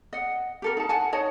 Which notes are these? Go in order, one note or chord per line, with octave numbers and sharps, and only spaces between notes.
D#5 F#5
G4 A4 A#4
D#4 A5
F#5 G#5 A5
D#4 C#5 D#5 A5